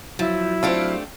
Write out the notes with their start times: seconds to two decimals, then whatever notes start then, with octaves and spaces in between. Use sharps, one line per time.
0.19 F3 F#3 E4
0.63 A3 C4 D4 F4 G4